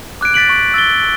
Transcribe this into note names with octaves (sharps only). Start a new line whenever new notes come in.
D6 F#6 G#6 D7
A6 B6 D7 F#7
C#6
E6 A6 D7 G7